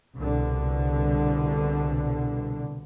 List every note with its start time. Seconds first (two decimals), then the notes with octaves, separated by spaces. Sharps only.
0.16 C2 B2 D3